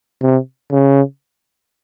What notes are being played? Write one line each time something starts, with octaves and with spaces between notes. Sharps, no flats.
C3
C#3